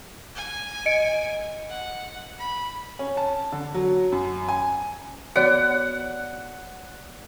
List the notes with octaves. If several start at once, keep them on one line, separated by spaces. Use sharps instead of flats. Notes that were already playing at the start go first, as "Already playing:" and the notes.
G#5
D#5 C#7 D7
F#5
B5
C#4
A5
D3
F#3
F#2
G#5
B3 F#4 C#5 D5 F#5 D7